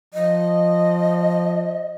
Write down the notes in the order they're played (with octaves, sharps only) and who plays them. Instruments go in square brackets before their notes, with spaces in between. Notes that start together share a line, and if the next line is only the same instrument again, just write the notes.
[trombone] F3 [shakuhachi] D#5